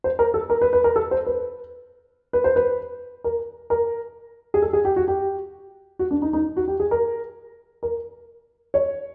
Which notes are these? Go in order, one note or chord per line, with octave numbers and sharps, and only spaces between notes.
C5
A#4
A4
A#4
B4
B4
A#4
A4
C5
B4
B4
C5
B4
A#4
A#4
G#4
A4
G#4
G4
F#4
G4
F#4
D4
D#4
D#4
F#4
G4
G#4
A#4
A#4
C#5